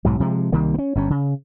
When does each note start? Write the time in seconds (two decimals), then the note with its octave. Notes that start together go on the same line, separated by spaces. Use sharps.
0.05 B1 G#2 F#3
0.20 C3 F3 G#3
0.52 C2 D#3 G3 A#3
0.74 B3 C#4
0.95 G1 G2 C#4
1.10 C#3